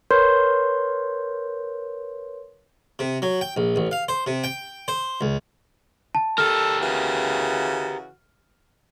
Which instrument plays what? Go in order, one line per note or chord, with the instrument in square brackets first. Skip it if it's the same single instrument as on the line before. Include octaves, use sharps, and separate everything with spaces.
[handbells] A#4 B4 C#5 C6 G6
[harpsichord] C3
F#3
G5
A#1
A1
F5
C5
C3
G5
C5
C#2
[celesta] A5
[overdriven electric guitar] G4 A#4 [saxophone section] A4 [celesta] F6
[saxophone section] C#3 E3 F#4